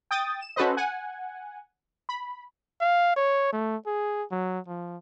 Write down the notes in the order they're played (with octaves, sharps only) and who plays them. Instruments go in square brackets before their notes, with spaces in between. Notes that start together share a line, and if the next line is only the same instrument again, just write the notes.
[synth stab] G5 D#6 A6
E7
C#4 F#4 A4 B4 C5 D#5
F#5 G#5
B5
[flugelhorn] F5
C#5
A3
G#4
F#3
F3